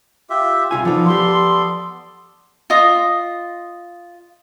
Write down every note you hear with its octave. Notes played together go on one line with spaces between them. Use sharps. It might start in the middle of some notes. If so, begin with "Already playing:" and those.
F4 G4 E5
C2 F4 G#5
F3 B3 D#4 F4 A4 D5
F3 G4 C6
F4 D#5 D#6